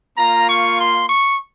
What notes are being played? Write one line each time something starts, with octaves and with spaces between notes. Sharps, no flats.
A#3 F4 A#5
C#6
C6
C#6